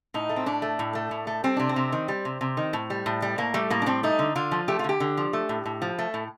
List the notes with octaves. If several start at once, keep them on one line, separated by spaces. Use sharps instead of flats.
A2 D#4
A3
C4
A2 D4
A3
A2
A3
A2
A3
G3 C4
C3 D4
C4
C3
D#3
G3
C3
C3
D#3
A2
G3
A2
G3
A2 A#3
G3 A3
A2 A#3
D4
G3 C4
A3 D#4
D3
D3 F4
F3
A3 G4
F4
D3 G4
D3
F3
A3
A2
A2
F3
A3
A2